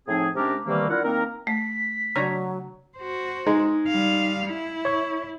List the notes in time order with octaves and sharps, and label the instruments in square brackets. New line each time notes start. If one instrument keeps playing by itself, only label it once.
[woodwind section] A2 F3 C4 D#4 G#4
C3 G#3 C#4 D4 G4 A#4
C3 D#3 E3 G3 A3 A#3
D4 E4 F4 A#4 F#5
D#3 A#3 C4 A#4
[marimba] A3 [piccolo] B6
[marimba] C#3 [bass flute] F#3 [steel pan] D4 C#5 A#5
[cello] F#4 C5
[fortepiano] G#3 [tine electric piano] D#4
[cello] G3 F5
E4
[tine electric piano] C#5 C#6